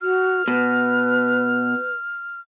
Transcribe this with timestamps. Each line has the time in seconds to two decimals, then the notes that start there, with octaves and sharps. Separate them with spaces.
0.01 F#4 F6
0.48 B2 B4